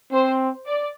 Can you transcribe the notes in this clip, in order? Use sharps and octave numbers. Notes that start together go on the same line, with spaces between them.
C4 C5
D5